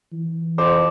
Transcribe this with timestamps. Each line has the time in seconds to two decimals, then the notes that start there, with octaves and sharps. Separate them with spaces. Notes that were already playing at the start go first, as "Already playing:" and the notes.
0.12 E3
0.58 F2 C5 D6